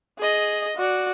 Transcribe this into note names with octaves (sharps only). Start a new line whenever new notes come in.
G#4 D#5
F#4 D5